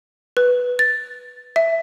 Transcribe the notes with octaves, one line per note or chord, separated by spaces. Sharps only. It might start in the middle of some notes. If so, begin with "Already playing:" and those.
B4
A6
E5